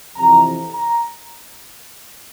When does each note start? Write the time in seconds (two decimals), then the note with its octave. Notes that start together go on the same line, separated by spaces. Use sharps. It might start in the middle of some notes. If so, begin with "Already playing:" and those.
0.16 F2 C3 E3 A#5
0.74 A#5